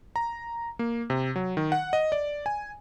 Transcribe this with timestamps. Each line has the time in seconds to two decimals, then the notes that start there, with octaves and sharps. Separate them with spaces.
0.16 A#5
0.79 A#3
1.10 C3
1.36 F#3
1.57 D#3
1.72 F#5
1.93 D#5
2.12 D5
2.46 G#5